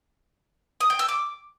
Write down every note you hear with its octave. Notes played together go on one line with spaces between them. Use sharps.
D#6
G5
E6
D6